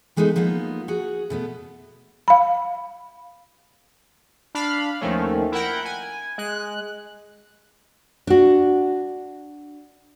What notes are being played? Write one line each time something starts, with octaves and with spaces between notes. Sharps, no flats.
E3 G#3 A3 B3 D#4
F3 A#3 B3 D#4
F#4 G#4
B2 A3 B3
F5 B5
D4 F5 B5 F6
D#2 D#3 F3 A3 C#4
E4 A#4 F#5 G5
G#5
G#3 F#6
D4 F#4